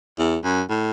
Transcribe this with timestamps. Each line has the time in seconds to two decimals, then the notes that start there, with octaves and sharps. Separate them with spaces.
0.19 E2
0.44 F#2
0.70 A2